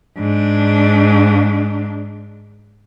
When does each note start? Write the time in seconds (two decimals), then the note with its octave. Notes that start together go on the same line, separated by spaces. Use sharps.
0.18 G#2 D4